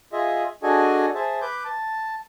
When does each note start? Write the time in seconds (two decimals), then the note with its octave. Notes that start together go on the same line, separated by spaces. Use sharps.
0.13 F4 G#4 D#5 E5
0.63 D4 F#4 G#4 A4 D#5 G#5
1.15 G#4 C5 E5 A5
1.42 B4 D6 G6
1.64 A5